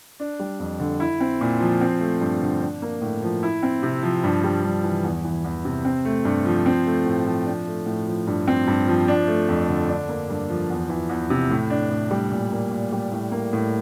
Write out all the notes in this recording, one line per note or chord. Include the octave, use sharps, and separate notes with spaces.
D4
G3
F2
D3
E4
C4
A#2
F3
C4
A3
G2
D3
D4
A#3
A2
F3
E4
C4
C3
F3
G2
G3
G2
E3
E2
E3
E2
C3
C4
A3
G2
F3
C4
A3
A2
F3
D4
A3
A2
F3
G2
C4
G2
F3
D4
A3
F2
D3
D4
A#3
G2
F3
E2
E3
E2
C3
A2
D4
A2
G3
A#2
A#3
A#2
G3
A2
A#3
A2